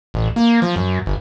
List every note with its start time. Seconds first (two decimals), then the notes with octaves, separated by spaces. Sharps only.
0.14 A1
0.36 A#3
0.62 F3
0.76 F#2
1.06 G1